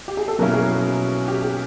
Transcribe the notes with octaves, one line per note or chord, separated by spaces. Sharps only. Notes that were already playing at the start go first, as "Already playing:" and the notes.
G4
G#4
A4
B2 F#3 A#3 C#4 E4 A#4
G#4
G4
G#4